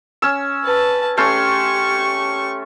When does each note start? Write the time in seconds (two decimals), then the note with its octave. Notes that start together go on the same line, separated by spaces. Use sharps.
0.22 C#4 E6
0.64 B4 A5
1.17 A3 C#4 G4 C6 C#6